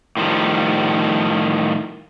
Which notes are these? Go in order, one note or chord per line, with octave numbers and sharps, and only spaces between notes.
A2 D#3 F3 G3